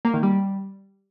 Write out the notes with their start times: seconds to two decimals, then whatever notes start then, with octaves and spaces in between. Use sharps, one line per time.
0.05 A#3
0.14 D#3
0.23 G3